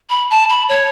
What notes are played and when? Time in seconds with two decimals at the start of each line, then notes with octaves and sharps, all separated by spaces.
0.10 B5
0.30 A5
0.49 B5
0.69 C#5